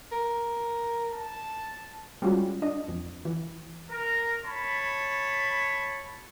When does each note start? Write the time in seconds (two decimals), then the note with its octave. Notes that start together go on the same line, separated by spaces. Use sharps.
0.12 A#4
1.13 A5
2.22 G3 G#3 C#4 F4 F#4
2.62 D4 D#5
2.88 F2
3.25 E3
3.89 A#4
4.46 C#5 A5 B5